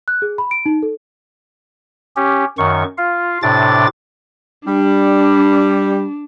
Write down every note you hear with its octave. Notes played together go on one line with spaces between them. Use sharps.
F#6
G#4
B5
D7
D#4
A4
C#4 G4
F#2 D#3 C#6
F4 F5
A2 C3 D4 D6 A6
G3 D4